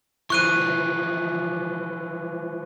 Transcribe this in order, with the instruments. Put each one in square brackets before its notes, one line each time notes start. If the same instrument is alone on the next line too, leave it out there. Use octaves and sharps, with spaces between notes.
[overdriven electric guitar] E3 F3 [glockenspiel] C#6 F#6 D#7